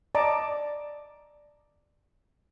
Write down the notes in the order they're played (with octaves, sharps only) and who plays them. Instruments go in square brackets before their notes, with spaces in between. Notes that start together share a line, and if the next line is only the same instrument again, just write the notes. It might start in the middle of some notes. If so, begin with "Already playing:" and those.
[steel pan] D5 D#5 A5 A#5 D6